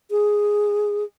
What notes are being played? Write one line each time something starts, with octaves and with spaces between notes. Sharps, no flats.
G#4